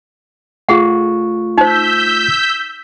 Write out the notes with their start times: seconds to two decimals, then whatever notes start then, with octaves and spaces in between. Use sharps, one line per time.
0.69 A3 F4 G#4 F#5 C#6
1.58 D#4 C5 E6 G6 B6